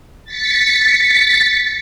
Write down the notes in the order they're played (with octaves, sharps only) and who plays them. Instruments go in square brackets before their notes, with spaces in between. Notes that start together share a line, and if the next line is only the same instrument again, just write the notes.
[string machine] A6 B6 C#7